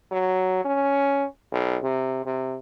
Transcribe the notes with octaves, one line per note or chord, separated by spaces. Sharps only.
F#3
C#4
B1
C3
C3